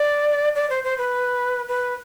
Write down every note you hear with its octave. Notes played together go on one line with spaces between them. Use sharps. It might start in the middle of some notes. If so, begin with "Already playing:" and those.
Already playing: D5
D5
C5
C5
B4
B4